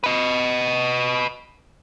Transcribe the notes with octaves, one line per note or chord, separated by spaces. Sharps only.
B4 D#5